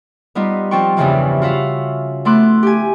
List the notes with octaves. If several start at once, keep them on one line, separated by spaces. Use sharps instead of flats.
G3 B3 D#4 F4
F3 C4 F4 G5 C#6
E2 G2 C#3 E3 F3
F4 F#4 E5 F5
A3 B3 E4 C6 D6 F#6
G4 G#5